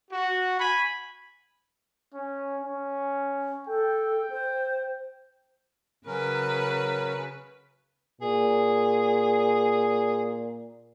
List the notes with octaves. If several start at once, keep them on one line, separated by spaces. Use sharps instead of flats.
F#4
G#5 B5
C#4
C#4
A4 G5
C5
C#3 F#3 C#4 A#4 B4
A#2 G#4